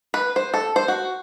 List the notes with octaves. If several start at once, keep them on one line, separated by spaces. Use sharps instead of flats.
B4
C5
A4
C5
F#4